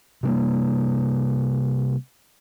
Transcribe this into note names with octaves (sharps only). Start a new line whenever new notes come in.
C3 G3 A#3